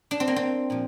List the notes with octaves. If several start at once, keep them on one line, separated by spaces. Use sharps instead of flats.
D4
C4
A#3
C4
A#2 F3